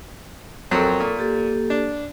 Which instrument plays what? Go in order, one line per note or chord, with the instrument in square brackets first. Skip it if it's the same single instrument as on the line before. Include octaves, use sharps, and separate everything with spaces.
[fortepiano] F2 F#3 C4 [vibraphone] A4 A#4 C#6
[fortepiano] A#2
[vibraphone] A#3 G4 A4
[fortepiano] D4